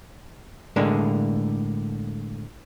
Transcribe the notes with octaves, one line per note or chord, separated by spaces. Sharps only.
A2 D3 G#3 A#3 D4